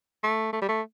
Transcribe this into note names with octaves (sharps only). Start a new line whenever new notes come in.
A3
A3
G3
A3